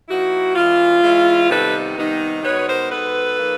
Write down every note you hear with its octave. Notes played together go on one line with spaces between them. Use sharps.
F3 A#3 D#4 E4 F#4
E3 G#3 C#4 E4 F4
E3 G#3 C#4 E4
C3 D#3 G3 B3 D#4 A4 B4
C3 D#3 G3 B3 D#4
B2 G#3 B3 D#4 B4 C#5
B4
A#4 C5
B2 G#3 B3 D#4 A4 B4
F3 A#3 D#4